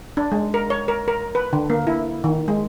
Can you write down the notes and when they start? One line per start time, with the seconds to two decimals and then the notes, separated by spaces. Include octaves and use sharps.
0.17 D4
0.32 G#3
0.54 A#4
0.70 C#5
0.88 A#4
1.08 A#4
1.35 B4
1.53 D3
1.70 A#3
1.87 E4
2.24 D#3
2.48 G#3